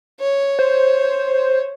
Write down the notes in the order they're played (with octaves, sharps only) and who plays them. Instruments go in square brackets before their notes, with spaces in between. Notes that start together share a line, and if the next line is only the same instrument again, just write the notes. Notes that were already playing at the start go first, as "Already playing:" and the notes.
[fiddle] C#5
[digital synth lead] C5